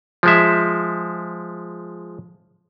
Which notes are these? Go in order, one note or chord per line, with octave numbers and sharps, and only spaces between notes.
F3 G#3 E5